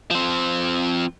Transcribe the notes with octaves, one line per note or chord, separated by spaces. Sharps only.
F3 C4